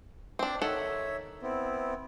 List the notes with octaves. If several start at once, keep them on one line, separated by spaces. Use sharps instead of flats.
C4 D4
D#3 A4 C#5 E5 F#5
B3 C4 E4